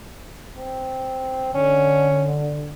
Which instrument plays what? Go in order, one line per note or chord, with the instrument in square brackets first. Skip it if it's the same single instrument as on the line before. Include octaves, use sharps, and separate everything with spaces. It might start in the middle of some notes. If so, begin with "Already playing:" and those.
[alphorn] C4
[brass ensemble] D3 [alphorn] C#4